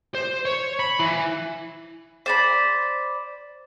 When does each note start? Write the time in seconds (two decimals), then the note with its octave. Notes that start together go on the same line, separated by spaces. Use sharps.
0.15 C5
0.45 C#5
0.80 B5
1.00 E3
2.26 C5 D5 B5